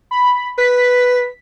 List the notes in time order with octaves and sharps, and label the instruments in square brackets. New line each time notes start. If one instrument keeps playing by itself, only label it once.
[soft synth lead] B5
[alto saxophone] B4 [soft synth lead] B6